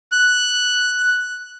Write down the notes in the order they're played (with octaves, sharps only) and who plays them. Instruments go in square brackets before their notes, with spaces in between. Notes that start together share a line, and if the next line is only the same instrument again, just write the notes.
[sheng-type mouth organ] F#6